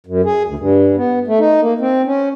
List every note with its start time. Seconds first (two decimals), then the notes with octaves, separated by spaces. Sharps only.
0.07 F#2
0.25 G#4
0.46 D2
0.59 G2
0.97 B3
1.27 A3
1.39 D#4
1.61 A#3
1.80 C4
2.05 C#4